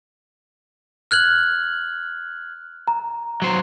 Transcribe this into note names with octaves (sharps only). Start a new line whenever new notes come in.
F6 F#6 G#6 F#7
A#5
F#3 C5